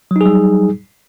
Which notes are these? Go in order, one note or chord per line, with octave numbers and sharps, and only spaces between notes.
F#3 G3 D#4 G#4